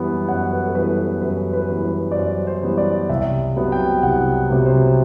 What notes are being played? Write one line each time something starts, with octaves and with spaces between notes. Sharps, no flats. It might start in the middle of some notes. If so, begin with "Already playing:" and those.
Already playing: F#2 E3 G3 B3
F#2 F#5
B4
A4
E3 G3 B3 B4
B4
F#2 B4
B4
E3 G3 B3
B4
D5
F#2 C5
C5
E3 G3 B3
D5
C2 E5
C3 F#3 B3
G5
C2 F#5
C3 F#3 B3
C5